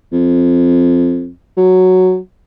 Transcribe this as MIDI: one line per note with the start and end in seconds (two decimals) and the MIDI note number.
0.12 1.29 41
1.57 2.17 54